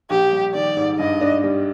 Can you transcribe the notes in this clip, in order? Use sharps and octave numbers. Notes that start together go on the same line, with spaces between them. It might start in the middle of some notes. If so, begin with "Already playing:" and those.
A#1 G4
G3
D#3 D5
G#2
G2 D#5
D4
G3